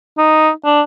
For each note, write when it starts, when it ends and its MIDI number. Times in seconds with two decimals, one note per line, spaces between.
0.18 0.50 63
0.65 0.82 62